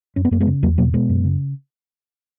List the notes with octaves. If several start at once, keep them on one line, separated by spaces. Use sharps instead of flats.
F#2 C#4
B3
F#2 A#3
G#3 B3
C#3
E2 F#3 A#3
B2 F#3 A#3
B2 G#3 B3
F#2
C#3